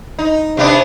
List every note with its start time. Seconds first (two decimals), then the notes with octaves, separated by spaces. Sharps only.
0.19 D#4
0.57 C3 B3 D4